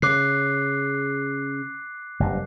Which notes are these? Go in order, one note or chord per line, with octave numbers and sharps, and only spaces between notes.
C#3 D6 F#6 C7
F#1 G2